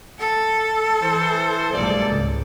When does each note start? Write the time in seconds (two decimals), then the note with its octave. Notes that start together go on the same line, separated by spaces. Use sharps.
0.19 A4
1.02 E3 C5
1.73 A#1 G2 F#3 G#3 A#3 D5
2.08 G#1 C#2